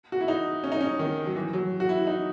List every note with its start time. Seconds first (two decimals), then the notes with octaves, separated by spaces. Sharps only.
0.12 F#4
0.21 E4
0.28 D#4
0.64 C#4
0.72 D#4
0.81 C#4
0.99 D#3
1.26 F#3
1.36 E3
1.53 F#3
1.80 F#4
1.89 E4
2.07 D#4